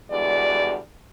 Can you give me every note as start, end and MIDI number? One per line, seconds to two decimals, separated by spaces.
0.11 0.76 40
0.11 0.76 50
0.11 0.76 55
0.11 0.76 56
0.11 0.76 66
0.11 0.76 74